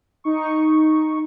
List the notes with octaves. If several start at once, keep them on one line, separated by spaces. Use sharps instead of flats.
D#4 C#6